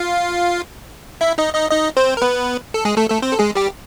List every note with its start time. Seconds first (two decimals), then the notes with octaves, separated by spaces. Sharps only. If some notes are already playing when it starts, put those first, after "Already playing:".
Already playing: F4 F5
1.21 E4 E5
1.38 D#4 D#5
1.55 D#4 D#5
1.71 D#4 D#5
1.97 C4 C5
2.17 A#4
2.22 B3 B4
2.74 A4
2.85 G#3 G#4
2.97 A3 A4
3.10 A3 A4
3.22 C4 C5
3.32 A4
3.39 G#3 G#4
3.55 G3 G4